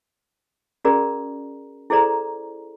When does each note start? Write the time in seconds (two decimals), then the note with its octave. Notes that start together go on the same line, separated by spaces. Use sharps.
0.85 C#4 F#4 G#4 A#4 D5 A#5
1.90 E4 G#4 A4 C5 D5 A#5